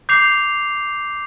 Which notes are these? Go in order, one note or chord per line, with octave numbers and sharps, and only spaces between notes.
D6 G6 C7 F7